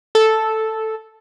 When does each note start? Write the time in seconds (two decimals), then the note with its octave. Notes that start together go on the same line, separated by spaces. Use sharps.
0.15 A4